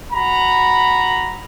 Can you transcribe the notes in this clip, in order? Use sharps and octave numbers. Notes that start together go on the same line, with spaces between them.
F#4 A#5 B5